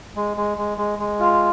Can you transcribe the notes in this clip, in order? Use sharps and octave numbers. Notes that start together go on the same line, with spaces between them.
G#3
G#3
G#3
G#3
G#3
F4